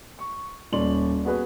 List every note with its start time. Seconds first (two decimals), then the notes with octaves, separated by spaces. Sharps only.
0.19 C#6
0.72 D#1 C#4 D5 C6 F#7
1.25 B3 F#4 G#4 B4